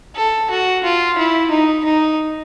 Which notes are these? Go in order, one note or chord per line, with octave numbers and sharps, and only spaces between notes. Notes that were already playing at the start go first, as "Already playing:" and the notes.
A4
F#4
F4
E4
D#4
D#4